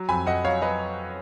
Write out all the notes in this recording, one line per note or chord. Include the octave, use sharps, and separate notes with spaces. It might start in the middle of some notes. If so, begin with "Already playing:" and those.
Already playing: F#3
F2 G#5 B5
F2 D#5 F#5
F#3 C#5 F5
F#3 B4 D#5